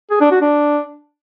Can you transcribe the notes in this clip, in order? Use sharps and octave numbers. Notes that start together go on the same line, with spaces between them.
G#4
D4
F#4
D4